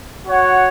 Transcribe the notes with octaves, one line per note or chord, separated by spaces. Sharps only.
F#4 C#5 F#5